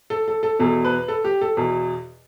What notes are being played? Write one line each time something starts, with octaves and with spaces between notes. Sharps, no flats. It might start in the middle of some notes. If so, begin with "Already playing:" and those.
A4
A4
A4
E2 B2 A4
B4
A4
G4
A4
E2 B2